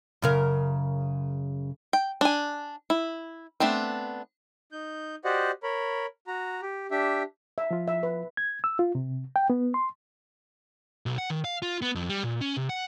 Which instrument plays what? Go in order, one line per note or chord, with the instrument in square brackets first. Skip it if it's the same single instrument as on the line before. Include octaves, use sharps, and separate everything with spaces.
[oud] F#2 C#3 A#4
[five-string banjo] G5
D4 G#5
E4
A3 B3 C4 D4
[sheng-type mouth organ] D#4 G6
F#4 G4 C5 D5 D#5 F#5
A#4 C#5 B5
F#4 A#5
G4
D4 G4 E5
[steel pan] E5
[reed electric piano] F3 F4
[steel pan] E5
B4
[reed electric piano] G#6
E6
F4
C3
G5
B3
C6
[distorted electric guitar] B1
F#5
D#3
F5
F4
B3
F2
G3
A#2
C#4
C3
F#5